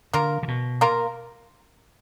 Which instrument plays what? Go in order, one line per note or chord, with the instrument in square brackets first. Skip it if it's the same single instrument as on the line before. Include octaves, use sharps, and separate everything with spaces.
[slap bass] D3 [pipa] A#3 F4 A#4
[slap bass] D3
B2
[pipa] A#3 F4 A#4